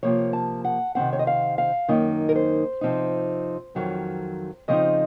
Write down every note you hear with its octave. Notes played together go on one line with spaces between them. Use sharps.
C3 F3 A#3 C#5
A5
F#5
C3 D#3 F#3 C4 F#5
C#5
D#5
F5
F5
F#2 D#3 A#3 D#4
A#4
C5
C3 F3 C4 D#4
F2 D#3 F#3 C4
C#3 F3 C4 D#4 D#5